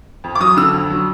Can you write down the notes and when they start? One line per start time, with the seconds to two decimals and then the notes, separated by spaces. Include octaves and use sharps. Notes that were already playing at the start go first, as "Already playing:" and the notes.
0.24 F2
0.35 D6
0.40 F#3 D#6
0.57 D3 E6
0.74 F2
0.90 F#3